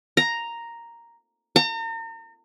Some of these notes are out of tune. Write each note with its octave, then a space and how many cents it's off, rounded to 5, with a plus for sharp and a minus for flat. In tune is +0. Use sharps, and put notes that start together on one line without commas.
A#5 +0
A#5 -40